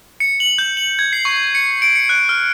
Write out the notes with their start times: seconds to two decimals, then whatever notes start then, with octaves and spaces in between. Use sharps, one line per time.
0.20 C#7
0.40 F#7
0.58 G6
0.77 F#7
0.99 G#6
1.13 C7
1.25 C#6
1.55 C#7
1.82 D7
1.96 C#7
2.09 F#6
2.29 F6